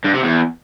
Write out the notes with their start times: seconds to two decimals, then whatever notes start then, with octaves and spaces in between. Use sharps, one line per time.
0.05 G2
0.14 C3
0.23 E2